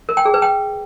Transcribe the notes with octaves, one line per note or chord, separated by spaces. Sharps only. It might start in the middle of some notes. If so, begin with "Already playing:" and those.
A#4
G5
G#4
B4
G5